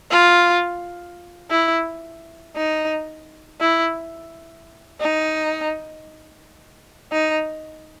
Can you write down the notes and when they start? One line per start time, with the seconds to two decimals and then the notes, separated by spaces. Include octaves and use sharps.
0.11 F4
1.50 E4
2.56 D#4
3.61 E4
5.01 D#4
7.12 D#4